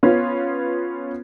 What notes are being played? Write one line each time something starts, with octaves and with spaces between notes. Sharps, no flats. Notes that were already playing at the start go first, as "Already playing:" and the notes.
B3 C#4 F4